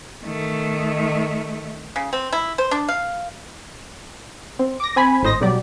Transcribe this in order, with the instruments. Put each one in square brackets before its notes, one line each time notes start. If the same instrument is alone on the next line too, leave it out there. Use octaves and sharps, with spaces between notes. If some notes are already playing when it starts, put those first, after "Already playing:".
[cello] D#3 A3
[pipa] C#3
C4
E4
C5
D4
F5
[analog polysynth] C4
D6 A#6
C4 G#5 B5
G#1 A2 C5 D#5 A#6
B1 F#3 G3 G4 D5